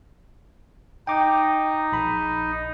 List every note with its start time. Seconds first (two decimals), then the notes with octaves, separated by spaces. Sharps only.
1.07 D#4 G5 D6
1.92 A#1 B5